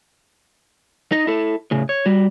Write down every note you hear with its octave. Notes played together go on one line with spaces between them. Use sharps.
D#4 D#5
E4 A4
A2 C#3
C#5
G3 F#4